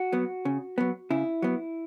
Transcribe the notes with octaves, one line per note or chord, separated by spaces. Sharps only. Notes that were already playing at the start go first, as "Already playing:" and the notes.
Already playing: F#4
F#3 B3
C#3
F#3 B3
C#3 E4
F#3 B3